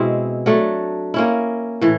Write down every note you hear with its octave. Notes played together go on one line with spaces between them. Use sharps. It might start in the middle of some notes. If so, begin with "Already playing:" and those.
Already playing: B2 G#3 C4 E4
F#3 A3 D4
A#3 C#4 E4
A2 E3